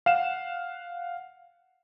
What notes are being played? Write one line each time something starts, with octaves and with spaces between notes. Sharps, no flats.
F5 F#5 E7